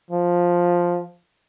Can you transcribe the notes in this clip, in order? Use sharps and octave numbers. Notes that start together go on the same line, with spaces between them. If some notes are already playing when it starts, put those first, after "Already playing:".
F3